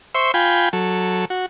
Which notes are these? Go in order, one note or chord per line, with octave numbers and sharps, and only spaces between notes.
C5 E5 C6 C#6
F4 G5 G#5 B5
F#3 A4
F#4